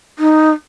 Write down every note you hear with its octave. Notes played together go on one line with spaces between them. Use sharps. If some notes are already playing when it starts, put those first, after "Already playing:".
D#4